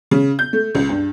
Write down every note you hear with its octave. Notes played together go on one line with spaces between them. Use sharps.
C#3
G6
A3
C#2
G2